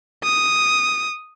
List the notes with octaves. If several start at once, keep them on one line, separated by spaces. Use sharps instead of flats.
D#6